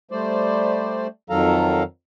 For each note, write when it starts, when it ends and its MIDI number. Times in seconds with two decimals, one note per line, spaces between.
0.11 1.07 55
0.11 1.07 57
0.11 1.07 72
0.11 1.07 74
1.30 1.83 41
1.30 1.83 51
1.30 1.83 54
1.30 1.83 69
1.30 1.83 77
1.30 1.83 82